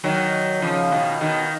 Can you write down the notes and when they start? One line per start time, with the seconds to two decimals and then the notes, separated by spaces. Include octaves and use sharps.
0.04 D#3 F#3
0.62 C#3 F3
0.91 B2 D#3
1.21 B2 D#3